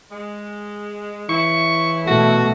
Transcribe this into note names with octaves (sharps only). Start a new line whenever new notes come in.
G#3
C#3 E3 E4 C#6
B2 A3 F#4